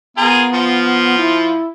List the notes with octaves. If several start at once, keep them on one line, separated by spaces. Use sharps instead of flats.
B3 F4 G#4 A#4
F3 F4
E4